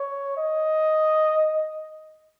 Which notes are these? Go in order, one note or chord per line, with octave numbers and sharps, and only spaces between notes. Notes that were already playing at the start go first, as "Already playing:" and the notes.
Already playing: C#5
D#5